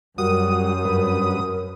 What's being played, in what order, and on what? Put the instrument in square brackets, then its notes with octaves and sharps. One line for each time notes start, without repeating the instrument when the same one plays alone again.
[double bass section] F#2 [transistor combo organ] G3 F#4 [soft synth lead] A#4 [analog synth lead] D#6
[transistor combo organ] G2 F#3 B4